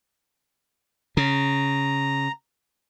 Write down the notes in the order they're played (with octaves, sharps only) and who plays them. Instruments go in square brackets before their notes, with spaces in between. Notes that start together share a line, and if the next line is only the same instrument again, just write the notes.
[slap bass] C#3 [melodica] A#5